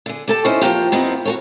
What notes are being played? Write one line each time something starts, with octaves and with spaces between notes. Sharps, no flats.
D3 G#4
G4 A4 A5
C#4 D#4 E4 C5
F3 F#3 A#3 G4
F2 B3 C4 D#4 E4
F#4 A4 C#5